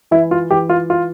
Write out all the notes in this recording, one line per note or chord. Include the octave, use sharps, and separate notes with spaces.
E3 E4
F4
E3 G4
F4
F4